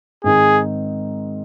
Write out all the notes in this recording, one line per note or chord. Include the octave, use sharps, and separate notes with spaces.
G#2 D#3 G#3 C4 D#4 G#4